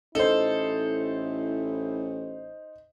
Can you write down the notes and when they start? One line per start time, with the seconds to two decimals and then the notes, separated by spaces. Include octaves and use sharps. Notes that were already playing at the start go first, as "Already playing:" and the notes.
0.15 A1 D#4 E4 A4 C5